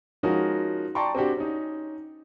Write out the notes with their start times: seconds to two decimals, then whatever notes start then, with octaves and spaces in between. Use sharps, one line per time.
0.23 F3 G#3 C#4 D#4 F#4 A#4
0.95 D5 G5 A5 A#5 C6 C#6
1.15 C4 D4 F#4 G4
1.37 C#4 D#4